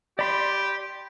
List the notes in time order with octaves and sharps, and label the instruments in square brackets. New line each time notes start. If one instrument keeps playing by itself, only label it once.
[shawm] G4 [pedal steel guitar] D5 B5 C6